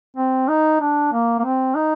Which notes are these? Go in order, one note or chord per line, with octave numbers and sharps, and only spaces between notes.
C4
D#4
D4
A#3
A#3
C4
D#4